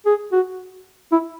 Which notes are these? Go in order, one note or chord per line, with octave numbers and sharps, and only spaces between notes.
G#4
F#4
E4